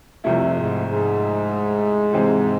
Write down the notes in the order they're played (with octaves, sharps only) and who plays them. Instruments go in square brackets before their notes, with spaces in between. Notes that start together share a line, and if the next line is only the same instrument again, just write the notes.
[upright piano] C2 C3 F3 A3 E4 [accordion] F2
[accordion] G#2
G#2
[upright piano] C3 E3 G#3 C4